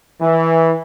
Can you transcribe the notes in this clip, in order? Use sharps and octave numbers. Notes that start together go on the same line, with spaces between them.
E3